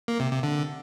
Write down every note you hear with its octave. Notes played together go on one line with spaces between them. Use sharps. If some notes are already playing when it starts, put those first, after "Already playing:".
A#3
C3
C3
D3